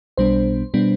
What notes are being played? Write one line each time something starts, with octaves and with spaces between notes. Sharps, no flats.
B1 B2 G3 B3 D4 C5
B2 G3 B3 D4